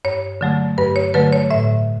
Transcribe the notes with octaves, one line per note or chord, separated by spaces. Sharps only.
G2 C#5
D3 F#3 A3
G2 B4
C#5
D3 F#3 A3 B4
C#5
A2 E5